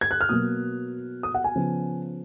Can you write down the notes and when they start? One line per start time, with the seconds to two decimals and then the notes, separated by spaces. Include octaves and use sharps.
0.01 G#6
0.11 F#6
0.21 F6
0.29 B2 F#3 A#3 D#6
1.23 D#6
1.35 F#5
1.44 G#5
1.55 C#3 F3 B3